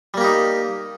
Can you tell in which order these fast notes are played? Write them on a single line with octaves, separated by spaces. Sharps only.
G3 A#3 G4 D#4